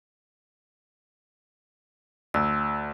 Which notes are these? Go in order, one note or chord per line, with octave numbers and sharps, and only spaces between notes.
D2 E6